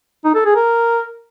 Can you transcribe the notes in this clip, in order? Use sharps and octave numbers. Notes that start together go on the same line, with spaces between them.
D#4
A4
G#4
A#4